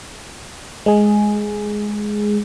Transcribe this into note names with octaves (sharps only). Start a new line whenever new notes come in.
G#3 G#4